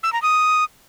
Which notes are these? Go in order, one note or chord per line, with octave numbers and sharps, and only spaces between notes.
E6
A#5
D#6